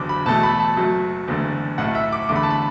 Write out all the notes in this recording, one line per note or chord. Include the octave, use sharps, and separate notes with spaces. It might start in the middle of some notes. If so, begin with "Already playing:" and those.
Already playing: F#1 E2 D3 F#3 D6
B5
E1 E2 B2 A3 A5
B5
A5
F#1 F#2 F#3 A3
F#1 E2 D3 A3
B1 A2 A3 F#5
E5
D6
E2 D3 A3 D6
B5
A5
B5